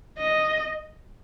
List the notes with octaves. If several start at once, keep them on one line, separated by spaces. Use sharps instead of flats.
D#5